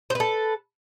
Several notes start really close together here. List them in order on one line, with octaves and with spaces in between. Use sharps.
C5 B4 A4